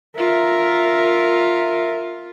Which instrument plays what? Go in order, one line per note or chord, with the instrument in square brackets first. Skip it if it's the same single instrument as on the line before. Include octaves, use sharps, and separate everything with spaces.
[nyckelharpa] F4 [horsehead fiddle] A#4 E5